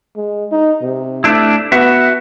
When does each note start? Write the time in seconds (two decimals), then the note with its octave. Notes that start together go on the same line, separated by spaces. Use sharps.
0.16 G#3
0.52 D#4
0.81 C3
1.24 A3 D4 E4
1.72 B3 F#4 E5